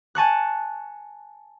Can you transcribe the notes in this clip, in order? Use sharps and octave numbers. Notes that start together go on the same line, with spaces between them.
G#5 A5 C#6 F#6